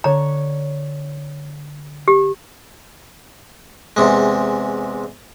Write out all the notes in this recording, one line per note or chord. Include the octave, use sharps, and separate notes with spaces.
D3 C#5 A#5 C#7
G4
E2 C3 G#3